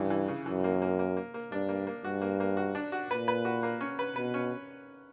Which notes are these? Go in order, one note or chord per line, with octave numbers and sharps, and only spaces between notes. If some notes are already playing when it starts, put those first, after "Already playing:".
Already playing: G2 C#3 E3
E3
C#3
F#2 E3
A#3
A#3
A#3
A#3
A#3
G2 D4
A#3
A#3
G2 F#4
A#3
A#3
F#4
D4
F#4
A#2 B4
B4
F#4
A#3
C#4
B4
B2 B4
C#4